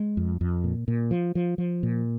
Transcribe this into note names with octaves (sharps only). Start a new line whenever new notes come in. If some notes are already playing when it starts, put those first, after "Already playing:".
Already playing: G#3
F2
F2
A#2
A#2
F3
F3
F3
A#2